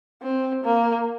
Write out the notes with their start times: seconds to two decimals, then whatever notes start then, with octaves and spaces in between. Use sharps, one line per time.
0.22 C4
0.64 A#3